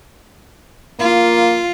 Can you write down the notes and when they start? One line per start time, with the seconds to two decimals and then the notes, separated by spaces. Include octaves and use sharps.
0.99 A#3 F4